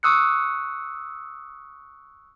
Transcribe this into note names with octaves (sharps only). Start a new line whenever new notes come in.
C#6 D#6 E6 F#6 C#7